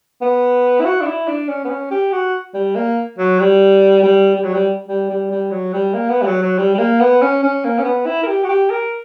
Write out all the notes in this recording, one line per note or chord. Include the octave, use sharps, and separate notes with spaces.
B3
E4
F#4
D4
E4
D4
C#4
B3
C#4
G4
F#4
G3
A#3
F#3
G3
G3
G3
F#3
G3
G3
G3
G3
F#3
G3
A#3
B3
G3
F#3
F#3
G3
G3
A#3
B3
C#4
C#4
A#3
C#4
B3
E4
A#4
G4
F#4
G4
A#4